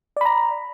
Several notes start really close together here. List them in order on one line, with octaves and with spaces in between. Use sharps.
D5 B5 A#5